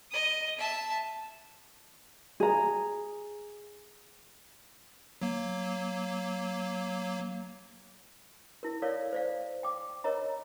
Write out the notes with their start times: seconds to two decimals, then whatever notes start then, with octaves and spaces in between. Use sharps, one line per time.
0.11 D#5 D#6
0.58 E5 A5
2.40 G#4 A#5
5.21 F#3 A#3
8.63 E4 A#4
8.82 A4 A#4 C#5 D5 F5
9.13 C5 D5 F5
9.63 G5 D6
10.04 A#4 C#5 D#5 A#5